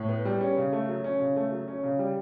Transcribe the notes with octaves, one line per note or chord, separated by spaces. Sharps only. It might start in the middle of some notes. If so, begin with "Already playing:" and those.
Already playing: A2
B3
G3
C#4
C#3
A3
F#3
C#4
C#3
A3
F#3
C#4
C#3
G3